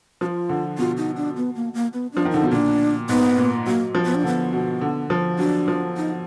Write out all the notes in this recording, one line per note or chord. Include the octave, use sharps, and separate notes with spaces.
F3 F#4
F4
D3
B2 F4
D#4
D4
B3
A#3
A#3
B3
F3 D4
D#3
D3 D#4
B2
A#2 D4
G#2 B3
A#2
F#3 A#3
F3
B3
D4
D3 B3
B2
D3
F3
F#3 D4
F3
D#4